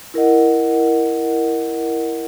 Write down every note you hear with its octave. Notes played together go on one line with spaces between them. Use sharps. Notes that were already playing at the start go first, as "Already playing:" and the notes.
E4 A#4 D#5 F#5